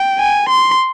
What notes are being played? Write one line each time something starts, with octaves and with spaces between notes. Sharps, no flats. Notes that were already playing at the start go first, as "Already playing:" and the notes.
Already playing: G5
G#5
C6